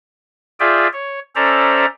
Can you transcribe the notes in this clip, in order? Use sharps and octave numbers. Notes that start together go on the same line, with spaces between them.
F4 G#4 D5 E5 G5
C#5
C#4 A4 C5 D5 E5 A#5